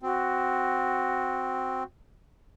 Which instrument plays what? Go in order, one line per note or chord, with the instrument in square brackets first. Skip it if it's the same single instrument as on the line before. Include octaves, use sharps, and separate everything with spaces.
[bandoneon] C4 [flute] F#4